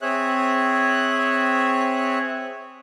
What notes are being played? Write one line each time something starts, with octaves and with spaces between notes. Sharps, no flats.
C4 G#4 C#5 E5 F#6